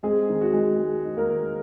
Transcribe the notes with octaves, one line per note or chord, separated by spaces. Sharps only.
G#3 C4 G#4
D#3
F#4
G#3
G#3
D#4
A#3 A#4
D#3